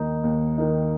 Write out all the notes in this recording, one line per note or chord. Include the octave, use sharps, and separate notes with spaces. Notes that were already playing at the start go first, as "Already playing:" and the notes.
Already playing: D#2 D#3 A#3 D#4
D#2
D#3 A#3 D#4